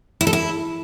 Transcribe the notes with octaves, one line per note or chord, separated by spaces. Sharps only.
E4
A4
E4